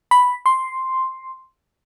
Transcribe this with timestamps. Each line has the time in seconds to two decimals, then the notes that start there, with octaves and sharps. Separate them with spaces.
0.11 B5
0.46 C6